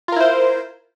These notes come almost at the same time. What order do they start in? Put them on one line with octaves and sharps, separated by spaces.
F4 A#4 E4 C5